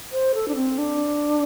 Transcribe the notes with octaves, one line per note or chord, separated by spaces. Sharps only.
C5
A4
D4
C4
D4